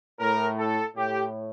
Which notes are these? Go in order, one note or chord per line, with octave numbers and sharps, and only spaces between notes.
A2 A#4
A4
A2 G4